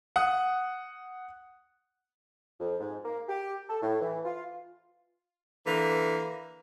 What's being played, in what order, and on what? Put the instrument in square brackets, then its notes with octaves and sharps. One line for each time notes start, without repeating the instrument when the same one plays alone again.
[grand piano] F#5 D#6 F#6
[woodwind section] F2
G#2
A#3
G4
A4
A2
E3
F4
[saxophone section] D3 E3 A#3